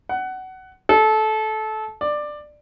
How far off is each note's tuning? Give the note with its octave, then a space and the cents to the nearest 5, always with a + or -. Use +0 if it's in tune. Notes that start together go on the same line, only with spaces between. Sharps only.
F#5 +20
A4 -20
D5 +15